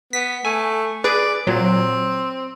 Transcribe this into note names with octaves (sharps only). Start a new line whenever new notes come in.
B3 B6
A3 G#5
G#4 B4 D5
A#2 F#3 C4